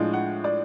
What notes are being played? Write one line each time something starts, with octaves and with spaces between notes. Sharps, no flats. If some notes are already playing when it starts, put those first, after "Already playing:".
Already playing: A2 F3 G#3 D4
F#5
D5